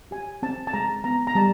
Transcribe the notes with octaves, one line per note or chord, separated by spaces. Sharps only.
G4 G#5
C4 A5
A5
G#3 A#5
B3 A#5
A#5
G3 A5